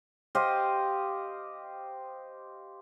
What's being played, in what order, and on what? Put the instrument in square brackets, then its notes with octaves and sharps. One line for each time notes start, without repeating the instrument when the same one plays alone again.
[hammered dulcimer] G4 C5 D#5 F5